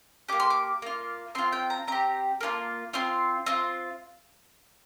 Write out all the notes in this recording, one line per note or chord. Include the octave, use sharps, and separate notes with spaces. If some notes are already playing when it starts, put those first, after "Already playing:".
A#3 G4 D6
C6
D6
A#3 F4
C4 F4 C6
G5
A#5
C4 G4 A#5
A#3 D4 F4
C4 F4 C6
C4 F4